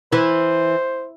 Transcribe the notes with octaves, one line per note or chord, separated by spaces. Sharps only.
E3 C5